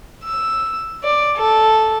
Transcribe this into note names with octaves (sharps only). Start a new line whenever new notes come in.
E6
D5
A4